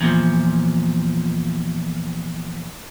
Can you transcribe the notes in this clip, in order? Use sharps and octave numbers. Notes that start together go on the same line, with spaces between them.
E2 A#2 D3 F3